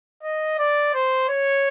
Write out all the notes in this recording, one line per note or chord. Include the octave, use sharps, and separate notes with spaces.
D#5
D5
C5
C#5